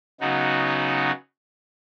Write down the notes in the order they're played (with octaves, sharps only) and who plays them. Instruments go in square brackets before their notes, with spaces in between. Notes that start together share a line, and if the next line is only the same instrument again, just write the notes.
[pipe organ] C#3 F#3 B3 D#4 F#4